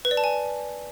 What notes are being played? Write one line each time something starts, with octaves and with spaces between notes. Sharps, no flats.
B4
D5
A5
G#5